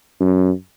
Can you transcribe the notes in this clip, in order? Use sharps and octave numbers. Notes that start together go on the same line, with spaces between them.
F#2